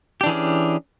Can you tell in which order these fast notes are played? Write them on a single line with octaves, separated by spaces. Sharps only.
G4 D4 E3 G#4 C#4